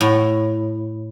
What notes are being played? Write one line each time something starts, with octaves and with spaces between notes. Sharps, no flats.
A2